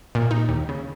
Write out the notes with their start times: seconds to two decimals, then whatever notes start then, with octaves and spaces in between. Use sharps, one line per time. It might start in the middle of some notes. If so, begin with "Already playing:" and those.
0.15 A#2
0.31 D#4
0.49 D#2
0.69 C#3